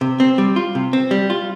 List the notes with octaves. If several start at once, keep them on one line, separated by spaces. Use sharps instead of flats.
C3
C4
G3
F4
C3
C4
G3
F4